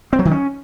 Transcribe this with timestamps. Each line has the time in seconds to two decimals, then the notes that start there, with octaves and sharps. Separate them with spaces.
0.13 C4
0.19 F#3
0.25 D#3
0.31 C#4